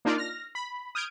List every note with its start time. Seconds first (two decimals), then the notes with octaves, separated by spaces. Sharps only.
0.05 A#3 D4 D#4 F4 D5
0.18 F6 A#6
0.55 B5
0.95 D#6 F6 G6 G#6 D7